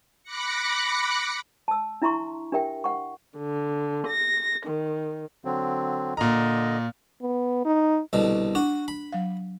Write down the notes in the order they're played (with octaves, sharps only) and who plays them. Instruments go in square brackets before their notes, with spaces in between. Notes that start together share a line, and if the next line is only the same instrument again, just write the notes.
[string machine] B5 D6 F#6 A#6 C#7
[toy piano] A5 E6
D4 E4 E5 A#5 C6 C#6
D4 G4 A#4 E5 G5
F#5 C#6
[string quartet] D3
A#6
D#3
[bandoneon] D3 F#3 C4
[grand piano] A#2 A#5 [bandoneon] D3 D#5
[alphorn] B3
D#4
[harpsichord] C2 B2 D3
[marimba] D4 [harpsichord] F#4
[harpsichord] B5
[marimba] F#3 F5